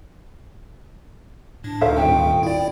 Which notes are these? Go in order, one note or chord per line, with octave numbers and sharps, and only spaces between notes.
A2 D4
D2 D3 D#4 A4 C5 E5 F5
D#1 G#1 G5
E4 D5